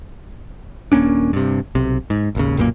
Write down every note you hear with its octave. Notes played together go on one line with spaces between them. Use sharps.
D#1 A#3 C#4 D4
G2 C3
B1 C3
G#2
G#1 D#2 C#3
B1 F#2 A#2 A#3